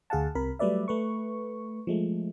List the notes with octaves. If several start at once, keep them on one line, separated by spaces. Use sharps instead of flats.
D2 G#4 F5 F#5 A5
C2 C3 A#4 B5
F#3 G3 A3 B4 D5 E5
A3 B4 C#6
F3 G#3 A3